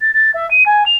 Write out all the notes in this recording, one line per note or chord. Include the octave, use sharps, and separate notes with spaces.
A6
A6
E5
D#7
G#5
F7